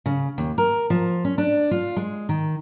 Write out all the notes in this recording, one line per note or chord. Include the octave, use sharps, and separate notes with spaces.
C#3
D#2
A#4
F3
C#4
D4
F4
G#3
D#3